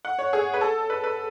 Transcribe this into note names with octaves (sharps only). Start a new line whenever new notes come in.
F#5
C#5
G#4
B4
A4
B4
B4